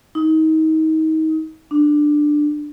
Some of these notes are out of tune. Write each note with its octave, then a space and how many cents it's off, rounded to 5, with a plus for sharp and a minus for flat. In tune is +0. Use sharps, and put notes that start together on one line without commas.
D#4 +30
D4 +15